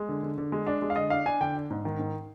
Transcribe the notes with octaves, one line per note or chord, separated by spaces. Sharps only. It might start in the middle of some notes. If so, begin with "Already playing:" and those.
Already playing: G#3
D3
D3
D3
G#3
D4
G#3
F5
D3 D#5
D4 F5
D4 G#5
D3 G5
D4
G#2
D#3
G#2